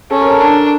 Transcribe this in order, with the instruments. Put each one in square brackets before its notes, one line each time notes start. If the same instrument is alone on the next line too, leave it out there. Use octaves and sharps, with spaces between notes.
[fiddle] C#4 [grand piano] A4
[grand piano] A#4
A4
[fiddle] D4